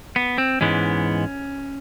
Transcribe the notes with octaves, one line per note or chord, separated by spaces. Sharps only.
B3
C4
G#2 E3 G#3 B3 C#4